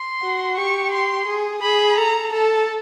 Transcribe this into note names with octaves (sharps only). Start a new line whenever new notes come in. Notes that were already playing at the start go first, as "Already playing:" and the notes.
Already playing: C6
F#4
G4 C#6
C6
G#4
G#4 B5
A4 A#5
A4 A5